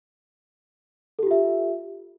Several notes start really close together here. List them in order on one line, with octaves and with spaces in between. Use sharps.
A4 G4 F4 E5